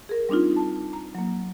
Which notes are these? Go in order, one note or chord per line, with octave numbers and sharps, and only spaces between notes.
G#4 A#4
G3 C4 D4 D#4 F4
A5
A#5
F#3 A#3